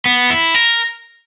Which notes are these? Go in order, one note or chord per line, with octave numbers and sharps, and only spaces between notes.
B3
E4
A#4